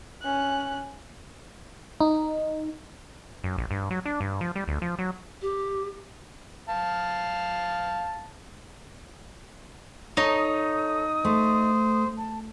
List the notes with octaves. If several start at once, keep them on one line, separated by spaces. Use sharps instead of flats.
C#4 F#6
D#4
F#2
A#1
G2
F#3
D4
G2
F3
G3
D2
F3
F#3
G4
F5 A5
D#4 A4 C#5 D#6
A3 C5
A5